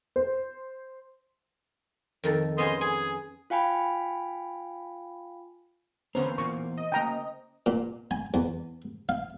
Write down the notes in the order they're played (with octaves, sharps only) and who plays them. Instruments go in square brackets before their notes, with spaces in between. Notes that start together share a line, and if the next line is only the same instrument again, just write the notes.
[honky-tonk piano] C5
[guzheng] F2 D#3 A4
[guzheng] B3 C#4 G#4 [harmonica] C5 D#5
[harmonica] G#4 [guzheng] G#5
[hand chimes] F4 F5 G5 G#5 B5
[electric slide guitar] E2 A#3 A#5 [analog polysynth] D3 B3 C#4 [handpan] C5
[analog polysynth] A#2 [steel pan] C#6
[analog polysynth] D#5
[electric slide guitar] C#3 A#3 [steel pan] G5 A#5
[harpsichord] A#2
G#5
E2
F5